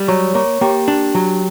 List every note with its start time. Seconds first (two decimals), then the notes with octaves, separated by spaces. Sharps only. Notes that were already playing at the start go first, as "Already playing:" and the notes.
Already playing: G3
0.08 F#3 C#5 C#6
0.34 A#3 C#5 C#6
0.61 A#3 G4 G5
0.88 D4
1.15 F#3